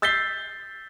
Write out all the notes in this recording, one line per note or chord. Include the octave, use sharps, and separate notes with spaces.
E6 G6 A6 B6 C7 G7